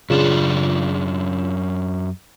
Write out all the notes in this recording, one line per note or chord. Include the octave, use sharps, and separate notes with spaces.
F#2 C#3 D4 F4 E7